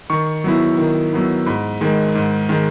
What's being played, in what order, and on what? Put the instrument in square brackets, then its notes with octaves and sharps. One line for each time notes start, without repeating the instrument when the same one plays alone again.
[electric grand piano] D#3 C#6
F#3 B3 E4
D#3
F#3 B3 E4
G#2 B5
D#3 G#3
G#2
D#3 G#3